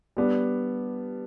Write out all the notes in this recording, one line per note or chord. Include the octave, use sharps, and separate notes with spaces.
G3 B3 D4